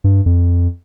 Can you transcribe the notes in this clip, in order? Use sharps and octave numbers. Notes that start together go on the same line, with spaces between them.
G2
F2